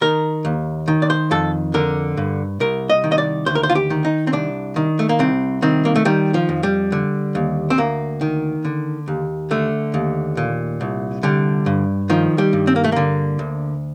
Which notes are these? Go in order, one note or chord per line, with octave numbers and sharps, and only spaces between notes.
D#3 A#4
D#2
D#3
D5
C5
F2 A4
D3 A#4
G2
C2 A#4
D#5
D#3
D#5
D5
D2 C5
A#4
C5
F4
G4
D#3
D#4
C4
C2 D4
D#3
A3
A#3
C2 C4
D#3 C4
A#3
A3
D#3 G3
F3
F2
G3
D3
D#2
C4
D2 A#3
D#3
D3
D#2
D3 A3
D#2
A#2
C2
D3 G3
G2
D#3 F3
G3
G2
C4
A#3
A3
D3 A#3
D2